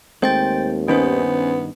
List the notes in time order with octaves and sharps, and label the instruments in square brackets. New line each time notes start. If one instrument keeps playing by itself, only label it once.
[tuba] D#2 [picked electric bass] G#3 A3 C4 [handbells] C5 G5 A6
[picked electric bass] G2 D#3 [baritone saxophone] B3 [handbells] C#4 C5